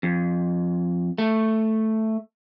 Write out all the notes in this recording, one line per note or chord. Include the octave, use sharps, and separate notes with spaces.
F2
A3